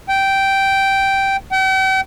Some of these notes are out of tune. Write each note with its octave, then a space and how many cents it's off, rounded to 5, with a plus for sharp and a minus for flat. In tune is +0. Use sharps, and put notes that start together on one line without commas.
G5 -10
G5 -45